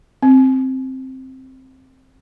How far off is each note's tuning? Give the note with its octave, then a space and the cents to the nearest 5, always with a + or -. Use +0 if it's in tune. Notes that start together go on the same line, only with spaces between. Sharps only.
C4 +5